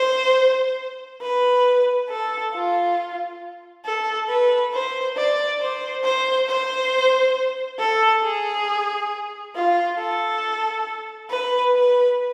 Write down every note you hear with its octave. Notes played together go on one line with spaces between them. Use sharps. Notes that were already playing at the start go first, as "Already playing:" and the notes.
Already playing: C5
B4
A4
F4
A4
B4
C5
D5
C5
C5
C5
A4
G#4
F4
A4
B4
B4